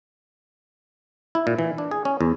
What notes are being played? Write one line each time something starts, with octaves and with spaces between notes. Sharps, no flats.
E4
A#2
E3
D4
G#4
C#4
E2